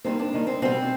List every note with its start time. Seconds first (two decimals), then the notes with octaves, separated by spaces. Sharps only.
0.04 D#2 D#3 G3 C4
0.19 D4
0.33 D#2 D#3 G3
0.47 C4
0.62 B2 G3 C4